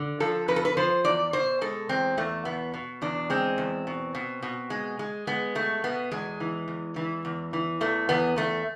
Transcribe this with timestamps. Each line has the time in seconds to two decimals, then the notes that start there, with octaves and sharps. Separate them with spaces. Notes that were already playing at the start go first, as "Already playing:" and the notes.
Already playing: D3
0.20 F3 A4
0.48 F2 B4
0.56 A4
0.65 B4
0.77 F3 C5
1.04 E2 D5
1.33 B2 C5
1.61 G#3 A4
1.89 E2 C4
2.17 E2 A3
2.45 B2 B3
2.74 B2
3.02 E2 D4
3.30 G#3 C4
3.58 E2
3.87 B2
4.15 B2
4.42 B2
4.70 G#3
4.99 G#3
5.27 G#3 B3
5.55 B2 A3
5.84 B2 B3
6.11 E2 G#3
6.40 E3
6.68 E2
6.96 E3
7.25 E2
7.53 E3
7.81 E2 A3
8.09 E2 B3
8.36 E2 A3